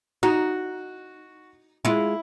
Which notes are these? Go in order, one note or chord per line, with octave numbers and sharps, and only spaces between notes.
D#4 F#4
G#3 E4 F4